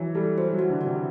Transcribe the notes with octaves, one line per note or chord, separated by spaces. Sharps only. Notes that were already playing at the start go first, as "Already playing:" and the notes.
Already playing: E3 F#3
G3 A4
F#3 C5
F#3
F#4
D3
F#4
C3